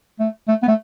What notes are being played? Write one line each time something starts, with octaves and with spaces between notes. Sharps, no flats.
A3
A3
B3
A3